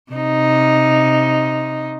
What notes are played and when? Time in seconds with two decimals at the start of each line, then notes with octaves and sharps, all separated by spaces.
0.12 C3 D#4